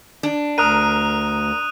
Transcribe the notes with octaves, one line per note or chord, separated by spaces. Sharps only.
D4
D2 A#4 D#6 F#6 D#7